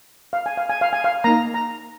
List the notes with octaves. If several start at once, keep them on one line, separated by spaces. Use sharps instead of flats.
F5
G#5
F5
G#5
F5
G#5
F5
A#3 D#4 A#5
A#5